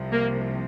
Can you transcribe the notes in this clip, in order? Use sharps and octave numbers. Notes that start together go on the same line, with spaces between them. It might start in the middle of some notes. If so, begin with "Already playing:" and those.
Already playing: C2 C3 F3
A#3